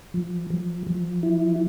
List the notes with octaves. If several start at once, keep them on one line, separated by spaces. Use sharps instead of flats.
F3
F3
F3
E4